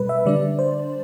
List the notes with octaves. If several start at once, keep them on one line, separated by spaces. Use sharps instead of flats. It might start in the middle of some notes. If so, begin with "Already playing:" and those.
Already playing: B2 G3 B4
E5
D3 G3 D4 D5
C5